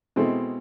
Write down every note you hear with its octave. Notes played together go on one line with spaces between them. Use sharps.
B2 G#3 C4 E4 A4